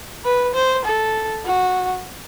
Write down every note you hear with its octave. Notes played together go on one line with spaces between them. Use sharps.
B4
C5
A4
F#4